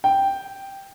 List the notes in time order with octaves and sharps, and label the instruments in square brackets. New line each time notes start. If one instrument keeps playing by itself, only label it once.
[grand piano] G5